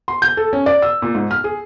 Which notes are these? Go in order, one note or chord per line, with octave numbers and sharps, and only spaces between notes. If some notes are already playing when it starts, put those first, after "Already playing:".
C6
G6
A4
C#4
D5
E6
A#2
G#2
F6
G#4